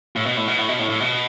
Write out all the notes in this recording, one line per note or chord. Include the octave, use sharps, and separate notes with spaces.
A2
B2
A2
B2
A2
B2
A2
A2
B2